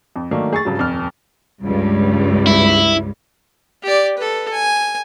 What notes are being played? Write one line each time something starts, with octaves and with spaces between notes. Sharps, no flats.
F2
D#3 F#3 A3 A#3 D4
G#4 C#6 A6
G2 C#3 F#3
D#1 F2 F6
C#2 G2
E4
G4 D5
A4 B4
G#5